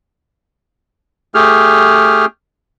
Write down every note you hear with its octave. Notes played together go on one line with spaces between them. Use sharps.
A3 G4 G#4 F6